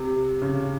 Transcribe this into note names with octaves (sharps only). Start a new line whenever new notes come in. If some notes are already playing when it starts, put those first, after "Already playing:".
Already playing: C3
C#3